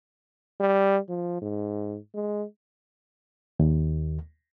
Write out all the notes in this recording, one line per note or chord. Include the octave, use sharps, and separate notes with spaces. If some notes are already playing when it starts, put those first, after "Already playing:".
G3
F3
G#2
G#3
D#2